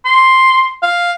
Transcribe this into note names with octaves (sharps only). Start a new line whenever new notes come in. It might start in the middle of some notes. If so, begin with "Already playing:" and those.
C6
F5